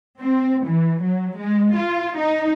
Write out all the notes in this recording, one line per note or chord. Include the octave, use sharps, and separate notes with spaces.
C4
E3
F#3
G#3
F4
D#4